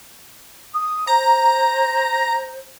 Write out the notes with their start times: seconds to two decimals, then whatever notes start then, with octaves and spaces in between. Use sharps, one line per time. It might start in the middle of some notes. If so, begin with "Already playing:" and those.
0.74 D#6
1.07 C5 A#5